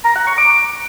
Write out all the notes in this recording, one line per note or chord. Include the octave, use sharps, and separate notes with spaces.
A#5
F#5
C#6
D6